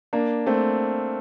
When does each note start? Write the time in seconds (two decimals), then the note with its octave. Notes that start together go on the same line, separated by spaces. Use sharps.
0.13 A#3 D4
0.46 A3 C4